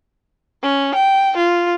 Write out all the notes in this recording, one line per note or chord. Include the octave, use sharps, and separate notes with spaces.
C#4
G5
F4